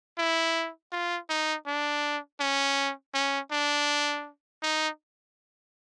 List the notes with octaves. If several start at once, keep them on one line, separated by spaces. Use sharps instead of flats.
E4
F4
D#4
D4
C#4
C#4
D4
D#4